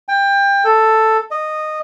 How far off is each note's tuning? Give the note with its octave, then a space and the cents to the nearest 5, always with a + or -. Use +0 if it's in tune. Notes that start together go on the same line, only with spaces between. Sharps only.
G5 +25
A4 +5
D#5 -10